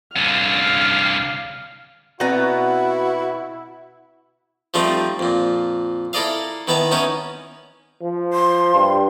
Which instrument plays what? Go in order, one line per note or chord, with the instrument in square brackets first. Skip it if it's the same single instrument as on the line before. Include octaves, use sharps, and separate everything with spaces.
[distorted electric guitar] C2 D3 [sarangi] F5
[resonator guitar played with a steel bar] B2 B3 [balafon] C4 D5 A#5 [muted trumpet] E4 [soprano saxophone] F#4
[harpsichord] F3 G3 A3 C4 D#4
F2 A#2
E4 A4 A#4 D5 D#5 F5
D#3 B3 E4 A5 A#5
B3 C#4 D#4 E4 A#4
[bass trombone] F3
[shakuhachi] C6
[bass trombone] G2